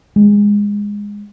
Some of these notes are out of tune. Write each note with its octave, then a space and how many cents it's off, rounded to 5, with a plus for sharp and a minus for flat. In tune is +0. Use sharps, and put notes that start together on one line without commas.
G#3 -15